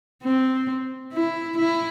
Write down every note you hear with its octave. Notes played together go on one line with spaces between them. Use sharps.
C4
E4
E4